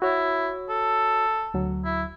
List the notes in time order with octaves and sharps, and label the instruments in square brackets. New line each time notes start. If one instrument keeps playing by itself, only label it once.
[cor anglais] E4 [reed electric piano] F#4 C#5
[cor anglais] A4
[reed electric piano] D2 F#3
[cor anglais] E4